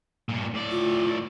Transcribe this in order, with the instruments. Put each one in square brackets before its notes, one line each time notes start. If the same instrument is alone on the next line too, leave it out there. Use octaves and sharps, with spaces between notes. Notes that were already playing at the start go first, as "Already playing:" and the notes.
[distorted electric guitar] G2 A#2
A2 D5
[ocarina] F4